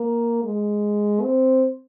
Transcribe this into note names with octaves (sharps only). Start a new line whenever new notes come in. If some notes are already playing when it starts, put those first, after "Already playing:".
Already playing: A#3
G#3
C4